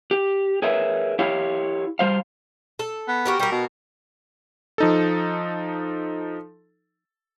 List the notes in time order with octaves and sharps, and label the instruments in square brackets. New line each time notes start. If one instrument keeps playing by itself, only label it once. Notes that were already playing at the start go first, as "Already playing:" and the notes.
[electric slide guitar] G4
G#4 A#4 B4 C#5 E5
E4 G4 C#5 F5
G3 C5 F5
[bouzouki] A4
[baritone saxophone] B3
[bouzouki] F#4 G4 A#4
[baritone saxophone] G3 [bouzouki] F#4 A#4
[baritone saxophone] B2
[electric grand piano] F3 D#4 A4